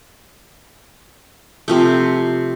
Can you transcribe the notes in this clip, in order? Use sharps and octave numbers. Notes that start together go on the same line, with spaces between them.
C3 F3 A3